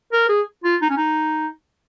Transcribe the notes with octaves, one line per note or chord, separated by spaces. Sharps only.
A#4
G#4
F4
D#4
C#4
D#4